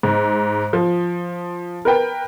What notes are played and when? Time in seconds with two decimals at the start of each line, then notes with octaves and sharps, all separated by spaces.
0.03 G#2
0.73 F3
1.85 A#4 B4 G5